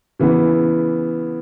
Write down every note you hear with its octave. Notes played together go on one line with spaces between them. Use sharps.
C#3 E3 B3